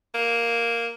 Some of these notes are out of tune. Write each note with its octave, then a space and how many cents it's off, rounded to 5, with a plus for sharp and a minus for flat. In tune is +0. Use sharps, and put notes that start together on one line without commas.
A#3 +0